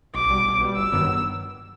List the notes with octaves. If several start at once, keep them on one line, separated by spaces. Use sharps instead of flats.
B1 D6
B2 G3
B1
B2 G3
G1 E6
G2 D#3 F#3 B3